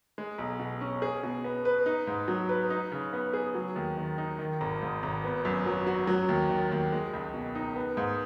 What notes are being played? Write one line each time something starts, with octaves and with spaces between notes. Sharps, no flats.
G#3
B1
B2
C#4
G#4
B2
B3
B4
D#4
G#2
F#3
B4
D#4
C#3
B3
G#4
F#3
D#2
D#3
D#4
D#3
G#1
G#2
G#1
B3
F#2
F#3
F#4
F#3
D#2
D#3
D#2
G#3
C#2
B2
D#4
B3
G#2